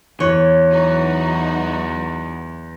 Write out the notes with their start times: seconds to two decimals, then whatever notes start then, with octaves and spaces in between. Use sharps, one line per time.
0.20 E2 E3 C#5
0.71 F#3 D#4 F#4